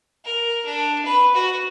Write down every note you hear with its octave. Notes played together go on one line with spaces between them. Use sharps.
A#4
D4
B4
F#4